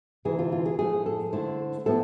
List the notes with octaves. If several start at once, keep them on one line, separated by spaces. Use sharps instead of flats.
D2 C3 E3 G#4
F4
F4
G#4
A2 F3 A3 G#4
A4
D3 A3 E4 C5
A2 F3 B3 A4